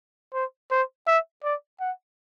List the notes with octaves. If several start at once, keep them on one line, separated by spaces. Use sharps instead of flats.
C5
C5
E5
D5
F#5